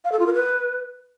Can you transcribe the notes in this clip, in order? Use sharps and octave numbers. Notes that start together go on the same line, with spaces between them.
F5
A4
F4
A#4
B4